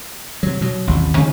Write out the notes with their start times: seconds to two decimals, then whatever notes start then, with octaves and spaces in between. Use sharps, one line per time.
0.43 C3 F#3
0.61 B2 F#3
0.87 A1 D#2 C3
1.17 C3 D#3 F3 A3